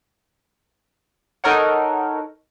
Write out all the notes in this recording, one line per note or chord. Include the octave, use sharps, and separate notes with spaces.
D#4 A4 A#4 C#5 F#5